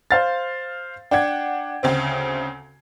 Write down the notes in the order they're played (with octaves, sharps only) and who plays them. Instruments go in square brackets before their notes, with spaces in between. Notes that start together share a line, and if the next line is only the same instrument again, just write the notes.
[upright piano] C5 F5 A6
[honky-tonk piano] D4 F#5 [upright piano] G5 G#6
[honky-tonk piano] D2 C#3 C4